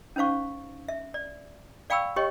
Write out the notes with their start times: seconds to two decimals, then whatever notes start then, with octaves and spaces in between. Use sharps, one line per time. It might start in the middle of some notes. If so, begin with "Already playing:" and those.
0.16 C#4 D#4 C5 F5 C#6
0.89 E5
1.14 D5
1.90 D5 F5 G5 B5 C#6 E6
2.16 G4 C#5 D#5 G5 C#6